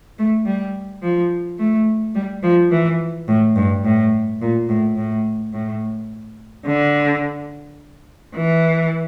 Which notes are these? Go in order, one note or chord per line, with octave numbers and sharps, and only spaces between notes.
A3
G3
F3
A3
G3
F3
E3
A2
G2
A2
A#2
A2
A2
A2
D3
E3